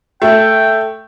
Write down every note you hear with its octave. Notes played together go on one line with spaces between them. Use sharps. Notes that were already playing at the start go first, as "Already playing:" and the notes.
A3 G5